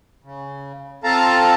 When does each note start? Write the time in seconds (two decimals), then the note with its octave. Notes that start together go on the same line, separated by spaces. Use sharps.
0.24 C#3
1.04 C4 F4 A4 F5 A5 A#5